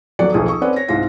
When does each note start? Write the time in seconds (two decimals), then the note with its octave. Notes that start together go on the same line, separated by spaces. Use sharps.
0.19 D#1 F#3 D5 F#5 C#7
0.33 D#1 B1 F3 G#4 D#6
0.48 C#6 D#6 E6
0.62 C4 C#4 B4 D5 F#5
0.76 C#5 A#6
0.88 C2 G#2 F4 A#6